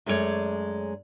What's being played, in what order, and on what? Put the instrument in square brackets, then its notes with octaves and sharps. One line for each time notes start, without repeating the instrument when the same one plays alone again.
[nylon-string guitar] F#2 G#3 A3 F4 C#5 D5